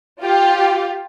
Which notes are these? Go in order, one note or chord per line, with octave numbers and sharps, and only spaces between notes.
F4 G4